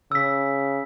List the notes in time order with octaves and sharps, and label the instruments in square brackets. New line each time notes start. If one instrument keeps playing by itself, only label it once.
[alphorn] C#3 [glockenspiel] E6 B6